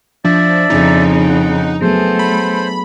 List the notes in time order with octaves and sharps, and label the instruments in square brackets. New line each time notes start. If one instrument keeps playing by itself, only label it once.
[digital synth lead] F3 [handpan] D4 [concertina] D5 E5
[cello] F2 C#3 [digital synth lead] D#4
[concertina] F#5
[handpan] F#3 B3 G#4 [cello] A3 [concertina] C5
[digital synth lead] B5